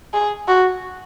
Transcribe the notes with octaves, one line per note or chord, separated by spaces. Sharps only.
G#4
F#4